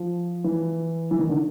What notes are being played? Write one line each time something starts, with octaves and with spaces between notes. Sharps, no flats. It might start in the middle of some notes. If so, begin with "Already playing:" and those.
Already playing: F3
E3
E3
D#3
D3